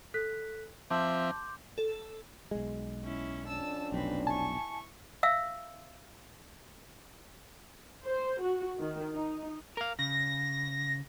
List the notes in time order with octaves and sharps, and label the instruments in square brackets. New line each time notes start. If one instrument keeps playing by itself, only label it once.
[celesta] A4 F#6 B6
[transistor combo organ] F3 C4 [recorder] E5 [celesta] A5 [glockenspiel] C6 D6 G6
[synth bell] A4
[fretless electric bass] B1 G#3
[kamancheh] C#4 E4
[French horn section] F2 C#4 D4 [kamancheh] A5 E6
[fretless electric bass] F1 B1 [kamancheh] C4 B4
[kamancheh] E4 C#6 [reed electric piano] G#5 A5
[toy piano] E5 F5 E6
[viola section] C5
F#4
D#3
D#4
[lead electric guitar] A#4 F5
[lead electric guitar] C#3 [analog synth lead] A#6